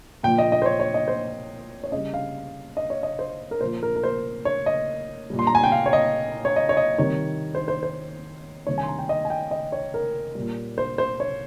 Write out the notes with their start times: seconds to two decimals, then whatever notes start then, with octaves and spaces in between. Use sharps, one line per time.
0.23 A#2 F3 G5
0.38 D#5
0.52 D#5
0.62 C5
0.66 C#5
0.80 C#5
0.94 D#5
1.08 C5
1.84 C#5
1.92 C#3 G3 D#5
2.14 F5
2.77 D#5
2.90 C#5
3.03 D#5
3.19 C5
3.51 A#4
3.61 A#2 F3 C5
3.83 A#4
3.96 A#4
4.04 C5
4.45 C#5
4.66 D#5
5.30 A#2 G3
5.39 C6
5.47 A#5
5.55 G#5
5.64 G5
5.72 F5
5.86 C#5
5.93 D#5
6.45 C#5
6.56 D#5
6.69 C#5
6.77 D#5
6.98 C3 D#3 G3 C#5
7.55 C5
7.68 C5
7.83 C5
8.67 C3 D#3 G3 C#5
8.78 G#5
8.83 C6
8.88 A#5
8.99 G5
9.09 D#5
9.25 G#5
9.30 G5
9.51 D#5
9.72 C#5
9.94 A#4
10.35 A#2 G3
10.78 C5
10.98 C5
11.20 C#5